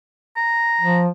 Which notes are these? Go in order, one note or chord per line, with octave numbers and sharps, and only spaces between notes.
A#5
F3